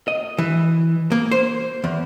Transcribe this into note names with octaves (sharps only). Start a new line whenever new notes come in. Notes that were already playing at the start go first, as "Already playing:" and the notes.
D#5
E3
A#3
C5
E2